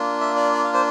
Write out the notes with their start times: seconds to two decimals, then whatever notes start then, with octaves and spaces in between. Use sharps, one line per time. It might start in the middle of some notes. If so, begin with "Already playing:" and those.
Already playing: A#3 D4 F4
0.21 E5
0.37 D5
0.53 D5
0.64 F5
0.74 C5